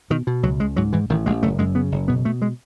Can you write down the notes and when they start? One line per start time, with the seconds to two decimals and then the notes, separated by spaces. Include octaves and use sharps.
0.10 B2 D#3
0.27 B2
0.43 C#2 F#3
0.60 C#2 G#3
0.76 G#2 F#3
0.93 G#2 E3
1.09 A1 D#3
1.26 A1 G#3
1.43 F#1 A3
1.59 F#2 G#3
1.75 C#3 B3
1.92 F#1
2.08 B2 B3
2.25 B2 A3
2.42 G#3